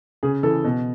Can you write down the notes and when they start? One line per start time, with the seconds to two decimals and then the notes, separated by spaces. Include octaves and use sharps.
0.23 C#3 G#4
0.43 E3 A4
0.64 B2